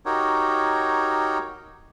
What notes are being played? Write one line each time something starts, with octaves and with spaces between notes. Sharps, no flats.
D#4 F#4 G4 A#4 C#5